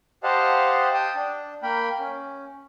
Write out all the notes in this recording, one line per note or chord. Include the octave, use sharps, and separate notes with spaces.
G4 C5 D#5 F5 F#5 A5
G5 A5 D#6
D4
A#3 A#4 G5 B5
C#4